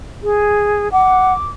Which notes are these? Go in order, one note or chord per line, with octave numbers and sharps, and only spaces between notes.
G#4
F#5 D6